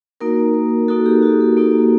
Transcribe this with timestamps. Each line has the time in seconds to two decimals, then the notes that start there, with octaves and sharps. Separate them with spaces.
0.21 A#3 D#4 F#4 A#4
0.88 A#3 D#4 F#4 A4
1.06 G4
1.23 F#4
1.40 A4
1.57 A#3 D#4 F#4